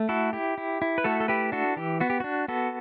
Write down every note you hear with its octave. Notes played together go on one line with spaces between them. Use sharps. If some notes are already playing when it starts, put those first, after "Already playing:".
Already playing: A3
E4 F#4 A4
E4 G4
E4
E4
B4
A3 F#4 A4
A4
E4 G4 B4
D4 F#4 A4
E3 G4
B3 F#4
G4
D4 F#4
B3 F#4 A4